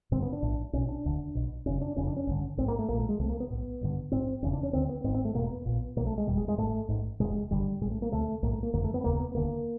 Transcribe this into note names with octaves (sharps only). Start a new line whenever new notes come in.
A1 G2 D3 C4
B3
D4
A#1 A2
B1 B2 C#4
D4
E1 D2 D3
B1 B2
F#1 F#2 C#3 C#4
D4
F1 F2 C#3 C#4
D4
C#4
A1 G2 D3
A1 G#2 C4
A#3
A3
A#1 A#2 A#3
A3
G#3
C2 C3 A3
A#3
B3
B1 A2
A1 G2 D3
A1 G#2 C4
E1 E2 C#3 C#4
D4
C#4
D2 D3 C4
B3
G#1 G#2 C4
C4
A3
E1 E2 B2 A#3
B3
A#1 A#2
B1 B2 A#3
A3
G#3
F#1 E2 B2 G3
G#3
G#3
G#1 G#2 A3
A1 G#2
E1 E2 C3 G#3
G1 G2 D3 G3
A2 G#3
A1
A3
A#3
D2 C3 A3
B1 A2 A#3
A3
A#3
F#1 F2 D3 A#3
A3
B3
E1 D#2 C#3 A#3
B3
E1 D2 D3 A#3